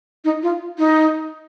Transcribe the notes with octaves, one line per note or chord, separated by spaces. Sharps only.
D#4
F4
D#4